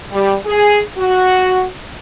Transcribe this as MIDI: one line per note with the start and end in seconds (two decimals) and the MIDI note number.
0.12 0.35 55
0.46 0.80 68
0.97 1.65 66